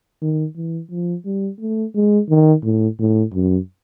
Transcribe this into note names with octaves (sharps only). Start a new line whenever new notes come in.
D#3
E3
F3
G3
A3
G#3
D#3
A2
A2
F#2